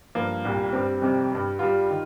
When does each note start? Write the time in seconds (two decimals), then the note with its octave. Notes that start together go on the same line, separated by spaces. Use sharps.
0.15 G2 F3 A#3
0.45 C2 A#2 G3
0.73 G2 G3 C4
1.02 F2 C3 G3
1.31 G2 G3
1.59 G2 G3 F4
1.90 D#3